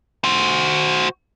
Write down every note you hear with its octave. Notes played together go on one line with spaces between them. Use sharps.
F#4 C5